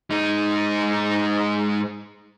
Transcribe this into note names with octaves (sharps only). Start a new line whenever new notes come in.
G#2 D#4